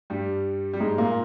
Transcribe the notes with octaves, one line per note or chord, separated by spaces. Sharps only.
G2 G3
G3
G#2 G#3
A#2 A#3